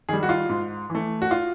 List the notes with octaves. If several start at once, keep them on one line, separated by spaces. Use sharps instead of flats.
D#3 G3 G#4
F#4
F4
G#2
E3 A3
F#4
F4